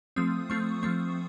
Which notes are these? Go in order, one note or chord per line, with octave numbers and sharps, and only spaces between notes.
F3 A3 C4 D#6
F3 A3 C4 C#6
F3 A3 C4 C#6